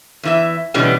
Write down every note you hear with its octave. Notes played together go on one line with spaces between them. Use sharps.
E2 E3 E5
B2 D3 E3 G3 B3 C#4